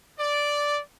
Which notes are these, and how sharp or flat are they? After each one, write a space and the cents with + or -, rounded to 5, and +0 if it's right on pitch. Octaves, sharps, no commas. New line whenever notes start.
D5 -5